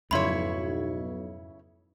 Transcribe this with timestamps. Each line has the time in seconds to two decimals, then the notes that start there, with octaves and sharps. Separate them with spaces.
0.11 B1 F2 G#2 C#3 E4 C#5 B5 C6